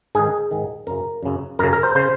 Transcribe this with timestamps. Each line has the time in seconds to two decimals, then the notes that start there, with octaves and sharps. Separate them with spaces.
0.15 G#2 D#3 G#4
0.51 G#2 D#3
0.87 F#2 C#3 A#4
1.23 F#2 C#3
1.59 F#2 C#3 A#4
1.73 A#4
1.83 C5
1.95 C#3 C5